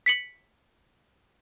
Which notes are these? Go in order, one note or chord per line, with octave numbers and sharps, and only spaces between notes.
B6 C#7 F#7